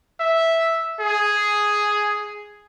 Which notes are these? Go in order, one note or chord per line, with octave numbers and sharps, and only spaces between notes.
E5
G#4